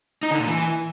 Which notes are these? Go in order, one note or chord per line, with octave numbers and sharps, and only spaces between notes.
D#4
D3
A#2
E3